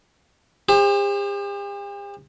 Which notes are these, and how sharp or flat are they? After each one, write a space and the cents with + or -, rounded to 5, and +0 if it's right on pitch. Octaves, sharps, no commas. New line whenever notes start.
G4 +45 C5 +25